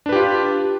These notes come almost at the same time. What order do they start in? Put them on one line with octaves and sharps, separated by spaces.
D4 B4 G4 F4